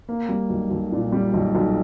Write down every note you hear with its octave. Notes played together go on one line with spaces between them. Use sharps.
A#3
G3
B1
B1
A#2
G3
B1
B1